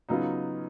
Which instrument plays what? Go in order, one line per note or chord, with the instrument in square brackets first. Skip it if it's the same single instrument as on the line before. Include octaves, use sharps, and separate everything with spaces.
[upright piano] C#3 F#3 B3 F4 [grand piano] D#4